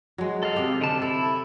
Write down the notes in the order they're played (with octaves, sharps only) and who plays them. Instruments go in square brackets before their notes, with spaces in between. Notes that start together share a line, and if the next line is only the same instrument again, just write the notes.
[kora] F#3 G#3
[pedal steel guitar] A4 D#5 F5
[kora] C3 G4
[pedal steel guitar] D3 A5
[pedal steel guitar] E4 [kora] A4